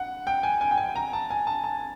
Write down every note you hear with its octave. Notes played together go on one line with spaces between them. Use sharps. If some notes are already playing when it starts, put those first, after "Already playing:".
Already playing: F#5
G5
G#5
G#5
G5
G#5
A#5
A5
G#5
A5
A5